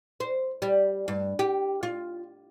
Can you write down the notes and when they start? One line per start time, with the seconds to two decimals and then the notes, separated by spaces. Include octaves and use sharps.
0.20 C5
0.62 G3
1.08 G2
1.39 G4
1.83 F4